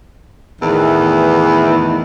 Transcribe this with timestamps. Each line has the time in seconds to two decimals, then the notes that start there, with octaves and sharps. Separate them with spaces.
0.62 E2 A2 D#3 E3